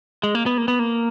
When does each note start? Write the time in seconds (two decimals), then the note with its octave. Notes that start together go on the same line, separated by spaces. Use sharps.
0.23 G#3
0.35 A#3
0.46 B3
0.58 A#3
0.68 B3
0.79 A#3